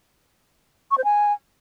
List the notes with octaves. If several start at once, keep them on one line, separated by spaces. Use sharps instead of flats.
C#6
C5
G#5